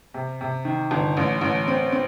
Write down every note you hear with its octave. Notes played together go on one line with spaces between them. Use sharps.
C3
C3
D#3
G1
A1
A1
C4
C4